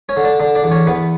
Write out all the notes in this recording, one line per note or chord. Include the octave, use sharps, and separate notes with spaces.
C#4 C#5
D3
D4 D5
D3 D4 D5
D4 D5
E2
C#4 C#5
E2 B3 B4